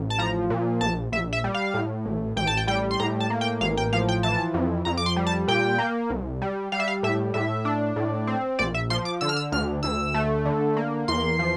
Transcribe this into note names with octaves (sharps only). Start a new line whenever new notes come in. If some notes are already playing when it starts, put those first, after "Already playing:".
Already playing: A1
A5
F3 A#5
A#2
A#1 A5
A#1 E5
E5
G3
F5
A2
A1
A1 G5
A5
G5
G3 G5
C6
A2 A#5
A5
A#3
G5
A1 F5
G5
F3 F5
G5
E3 A5
F2
F2 A#5
D6
C6
G3
A5
A#2 G5
A#3
C2
G3
G3 F5
E5
F5
A2 E5
A2 E5
D4
A2
C4
A#1 D5
E5
F3 C6
D6
D3 E6
F6
E6
D2 F6
D2 E6
A3
D3
A#3
E2 C6
F3